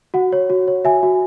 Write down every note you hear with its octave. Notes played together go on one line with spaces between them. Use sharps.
F#4 F#5
C#5
F#4
C#5
F#4 E5 G#5
F#4